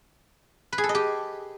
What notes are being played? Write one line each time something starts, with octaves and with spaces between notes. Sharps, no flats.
B4
G#4
A4
D#5
G4